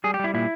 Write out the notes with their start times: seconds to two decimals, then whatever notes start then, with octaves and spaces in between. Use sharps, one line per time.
0.04 G3 G#4
0.14 G4
0.19 G3 E4
0.34 A#2 E4